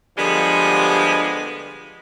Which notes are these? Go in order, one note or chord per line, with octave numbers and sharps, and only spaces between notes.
D3 F3 G3 G#3 B3